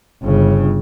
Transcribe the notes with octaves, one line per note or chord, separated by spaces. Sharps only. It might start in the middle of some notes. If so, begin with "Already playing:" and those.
G1 C#3